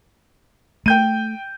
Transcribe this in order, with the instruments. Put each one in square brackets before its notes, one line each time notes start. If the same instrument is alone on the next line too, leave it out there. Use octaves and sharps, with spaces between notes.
[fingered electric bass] A3 [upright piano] G5 G6 D#7